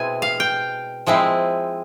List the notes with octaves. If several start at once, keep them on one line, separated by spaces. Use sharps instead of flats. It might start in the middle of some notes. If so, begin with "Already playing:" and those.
Already playing: B2 G#3 C4 E4 G#5
F5
G5
F3 G#3 C4 E4